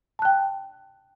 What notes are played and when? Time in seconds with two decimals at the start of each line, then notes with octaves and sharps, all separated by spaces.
0.19 A5
0.22 F#6
0.25 G5